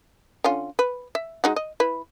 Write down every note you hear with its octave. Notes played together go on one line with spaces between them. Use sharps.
D3 C#4 F4
B4
E5
G#3 D#4 F#4
D#5
E4 B4